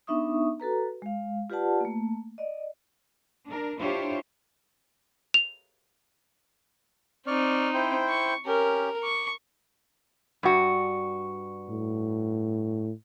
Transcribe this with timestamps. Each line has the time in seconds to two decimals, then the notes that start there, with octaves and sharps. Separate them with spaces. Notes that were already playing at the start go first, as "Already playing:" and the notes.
0.07 B3 D4 D#4 E5 C#6 D#6
0.60 F#4 A4 B4 A#5
1.02 G#3 F5
1.50 F4 G4 B4 D5 F#5 A5
1.80 A3 A#3
2.38 D5 D#5
3.47 D4 A#4
3.79 D4 E4 F4 G4 C5 C#5
5.34 F7
7.27 C4 D#4 D5 C#6 F6
7.74 E4 C5 G5
8.09 C#6
8.46 C#4 G4 A#4
9.03 C#6 D6
10.43 G2 F#4
11.69 A2